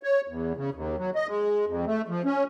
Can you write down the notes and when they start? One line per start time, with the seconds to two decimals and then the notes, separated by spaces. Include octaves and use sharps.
0.03 C#5
0.28 E2
0.57 C#3
0.74 D#2
0.98 F#3
1.15 D#5
1.27 G#3
1.67 F2
1.86 A3
2.08 F3
2.25 C#4